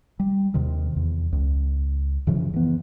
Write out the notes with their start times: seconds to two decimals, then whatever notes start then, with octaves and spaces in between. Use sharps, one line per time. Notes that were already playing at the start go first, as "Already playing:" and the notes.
0.20 G3
0.54 D#2 C3 D#3
0.96 E2
1.32 C#2
2.27 F#2 C#3 E3 F3
2.54 E3 B3